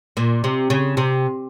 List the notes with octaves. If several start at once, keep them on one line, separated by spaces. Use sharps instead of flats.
A#2
C3
C#3
C3